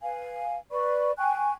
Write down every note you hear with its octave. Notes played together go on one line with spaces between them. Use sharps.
B4 F5 G#5
B4 D5 B5 C#6
G5 G#5 C#6 F#6